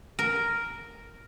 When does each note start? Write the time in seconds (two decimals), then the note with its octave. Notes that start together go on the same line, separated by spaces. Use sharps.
0.19 A#4